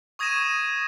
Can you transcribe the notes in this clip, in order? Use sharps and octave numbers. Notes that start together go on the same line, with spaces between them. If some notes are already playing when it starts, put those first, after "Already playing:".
C#6 D#6 G#6 A#6 D#7 E7